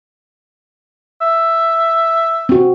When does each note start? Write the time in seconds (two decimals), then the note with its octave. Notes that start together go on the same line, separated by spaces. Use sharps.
1.21 E5
2.49 C4 F#4